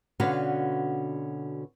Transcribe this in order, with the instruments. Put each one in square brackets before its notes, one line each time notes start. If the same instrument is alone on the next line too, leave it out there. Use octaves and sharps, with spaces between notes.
[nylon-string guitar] B2 D3 C#4 F#4 B4 F5